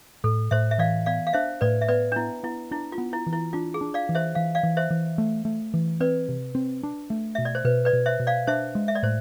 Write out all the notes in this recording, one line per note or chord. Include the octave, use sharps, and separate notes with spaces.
A2 A4
A2 C5 E5
E5
E3 D5 F5
B3 D5 F5
F5
D4 C5 E5
A2 B4 D5
E5
B3 B4 D5
D4
B3 E4
B3 E4
D4 E4
F4
B3
E4
E3
E4
D4 F4
G#4
D4
D5 F5
E3
C5 E5
E3 F5
D5 F5
E3
C5 E5
E3
A3
A3
E3
C4 B4 D5
C3
C4
D4
A3
B2 E5
D5
C5
B2 B4
B4 D5
B2
C5 E5
B2
D5 F5
D4 C5 E5
G#3
E5
D5
A2 C5